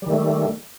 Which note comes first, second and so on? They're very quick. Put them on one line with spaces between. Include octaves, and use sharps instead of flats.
G3 D#3 A3